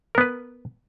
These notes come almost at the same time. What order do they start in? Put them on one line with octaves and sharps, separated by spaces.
A#4 B3 B4